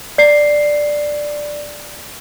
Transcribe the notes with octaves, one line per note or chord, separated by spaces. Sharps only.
D5 C7